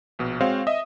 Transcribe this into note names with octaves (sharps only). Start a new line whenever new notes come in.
A#1 B2
G#3 C4 F#4 C5 C#5 F5
D#5 E5 D#6